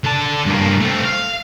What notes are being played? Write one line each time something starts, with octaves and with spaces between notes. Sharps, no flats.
D3 A5
G2 A#3
A3 C4
F5